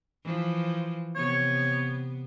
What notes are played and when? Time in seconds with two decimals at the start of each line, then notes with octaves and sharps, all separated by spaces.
0.24 E3 F3
1.15 C3 B3 C#5